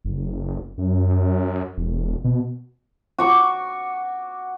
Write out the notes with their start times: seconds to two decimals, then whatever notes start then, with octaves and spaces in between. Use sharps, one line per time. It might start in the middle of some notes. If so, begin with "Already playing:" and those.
0.05 F#1
0.78 F#2
1.77 E1
2.24 B2
3.18 F#4 C#6 D6